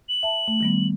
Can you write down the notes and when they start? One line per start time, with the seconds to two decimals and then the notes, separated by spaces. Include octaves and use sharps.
0.09 F#7
0.23 E5 A5
0.48 A3
0.61 D#3 G3 B3